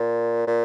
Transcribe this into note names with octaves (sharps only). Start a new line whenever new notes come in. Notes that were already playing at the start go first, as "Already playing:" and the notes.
Already playing: A#2
A#2